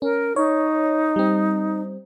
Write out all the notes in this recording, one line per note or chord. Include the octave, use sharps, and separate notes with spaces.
C#4 A#4
D#4 C#5
G3 C4